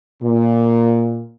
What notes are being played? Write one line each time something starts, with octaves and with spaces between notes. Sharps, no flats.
A#2